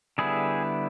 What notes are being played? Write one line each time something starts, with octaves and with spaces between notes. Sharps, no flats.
D3 G3 B3 E4 G#4